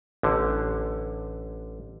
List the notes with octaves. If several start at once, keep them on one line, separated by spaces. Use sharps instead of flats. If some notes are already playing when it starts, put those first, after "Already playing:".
A1 D3